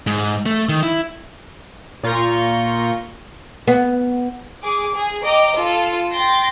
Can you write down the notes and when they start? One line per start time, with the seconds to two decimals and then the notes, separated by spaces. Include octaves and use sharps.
0.07 G#2
0.46 A3
0.69 D#3
0.83 E4
2.03 A#2 F4 A#5 C#6 G6
3.67 B3
4.63 G#4 D6
4.95 G#4
5.25 D#5 G5 A#5 D6
5.56 F4 A4
6.12 G5 C6 A6 A#6